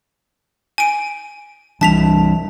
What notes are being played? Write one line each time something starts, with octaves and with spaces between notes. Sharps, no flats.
G#5 D7
E3 G3 D4 A5 B6 F7